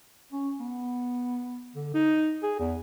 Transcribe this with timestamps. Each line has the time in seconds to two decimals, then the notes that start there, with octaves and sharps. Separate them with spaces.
0.32 C#4
0.60 B3
1.75 D3
1.94 D#4
2.43 G#4
2.59 E2